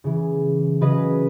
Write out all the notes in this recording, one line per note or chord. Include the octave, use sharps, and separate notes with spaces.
C#3 E3
C#3 F#3 B4 D#5